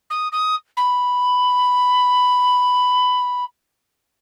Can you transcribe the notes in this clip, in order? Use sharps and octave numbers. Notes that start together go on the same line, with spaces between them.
D#6
D#6
B5